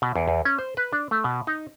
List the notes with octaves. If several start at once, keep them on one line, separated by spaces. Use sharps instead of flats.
B2
E2
E2
C#4
C5
B4
D4
A3
B2
D#4